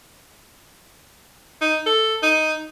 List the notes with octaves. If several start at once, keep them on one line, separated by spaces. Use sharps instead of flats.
D#4
A4
D#4